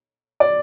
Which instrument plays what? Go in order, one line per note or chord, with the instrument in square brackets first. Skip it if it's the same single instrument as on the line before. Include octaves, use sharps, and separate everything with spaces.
[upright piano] D5